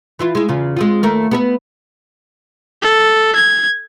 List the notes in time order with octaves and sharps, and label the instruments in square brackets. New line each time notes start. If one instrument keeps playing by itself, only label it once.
[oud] E3 E4 F4
G#3 E4
E2 C#3 F4
G#3 C4 F4
D#2 A3 A#4
B3 A4 E5
[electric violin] A4
G#6